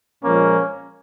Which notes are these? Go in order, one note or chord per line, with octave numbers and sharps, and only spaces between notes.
A#2 F3 G#3 A#3 C#4